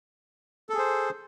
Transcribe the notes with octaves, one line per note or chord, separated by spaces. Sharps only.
G#4 A4 C5